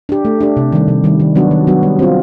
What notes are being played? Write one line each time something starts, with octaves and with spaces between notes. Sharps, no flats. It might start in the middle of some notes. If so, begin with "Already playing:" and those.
D4 G4
A3
D4 G4
C3
D#3 G3
C3
D#3 G3
D#3
F#3 B3 D4 F#4
D#3
F#3 B3 D4 F#4
G3
C4 F4